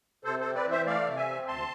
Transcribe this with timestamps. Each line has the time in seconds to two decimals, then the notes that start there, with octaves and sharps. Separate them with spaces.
0.24 C3 A4 C5
0.40 C4 A4 C5
0.55 B4 D5
0.65 E3
0.71 C5 E5
0.86 A3 D5 F5
1.07 C3
1.16 E5 G#5
1.27 C4
1.47 D2 A5 C6